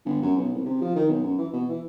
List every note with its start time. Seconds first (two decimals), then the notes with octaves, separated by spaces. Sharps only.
0.05 G1
0.22 F#2
0.36 B1
0.54 C2
0.66 C3
0.82 F3
0.96 D#3
1.08 B1
1.23 F#2
1.38 E3
1.53 B2
1.68 E3